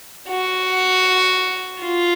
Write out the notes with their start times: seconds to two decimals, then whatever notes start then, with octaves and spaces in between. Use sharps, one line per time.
0.29 F#4
1.81 F4